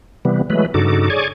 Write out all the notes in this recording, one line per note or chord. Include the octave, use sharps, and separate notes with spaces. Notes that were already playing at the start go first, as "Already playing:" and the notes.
C3 E3 G3 B3
E3 F#3 G#3 A3 B4
G2 C#3 D#4 F#4 A4 D6
G#4 C#5 D5 G#5 C#6 D6